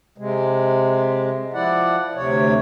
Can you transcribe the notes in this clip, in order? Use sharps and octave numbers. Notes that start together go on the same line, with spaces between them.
C3 G#3
F3 E4 D5 F#5
D2 C3 C#5